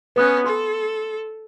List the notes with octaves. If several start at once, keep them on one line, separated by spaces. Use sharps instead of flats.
B3 C#4 B4 D#6 F#6
A4 C6